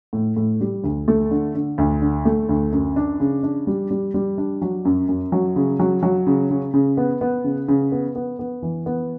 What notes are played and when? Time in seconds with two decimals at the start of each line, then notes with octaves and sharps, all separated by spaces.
0.13 A2
0.36 A2
0.61 G3
0.84 D2
1.08 A3
1.31 D3
1.55 D3
1.78 D2
2.02 D3
2.25 A3
2.49 D2
2.72 F#2
2.96 D4
3.20 C#3
3.43 D4
3.67 G3
3.91 G3
4.14 G3
4.38 D4
4.61 F#3
4.85 F#2
5.09 F#2
5.32 F#3
5.56 C#3
5.79 F#3
6.03 F#3
6.27 C#3
6.50 C#3
6.74 C#3
6.97 B3
7.21 B3
7.44 C#3
7.68 C#3
7.92 B3
8.16 B3
8.39 B3
8.62 E3
8.86 B3